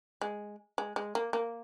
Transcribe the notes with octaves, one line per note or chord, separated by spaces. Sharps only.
G#3
G#3
G#3
A#3
A#3